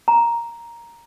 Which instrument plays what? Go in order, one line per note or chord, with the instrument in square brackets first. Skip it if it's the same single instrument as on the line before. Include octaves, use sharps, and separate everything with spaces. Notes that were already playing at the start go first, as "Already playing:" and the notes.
[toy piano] A#5